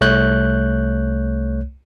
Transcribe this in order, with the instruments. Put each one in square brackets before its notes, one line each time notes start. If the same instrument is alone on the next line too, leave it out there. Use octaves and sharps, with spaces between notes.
[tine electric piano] C2 A3 C#5 F#6 G6